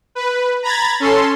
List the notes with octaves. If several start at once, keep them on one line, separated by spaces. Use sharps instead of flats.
B4
A#5 B5 G#6 A6
C#4 A4 C6